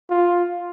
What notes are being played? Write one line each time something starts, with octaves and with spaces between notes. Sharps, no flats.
F4